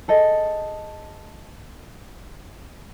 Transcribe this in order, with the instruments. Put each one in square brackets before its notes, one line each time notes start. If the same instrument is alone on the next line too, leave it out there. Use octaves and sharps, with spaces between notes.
[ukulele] G#4 A4 D#5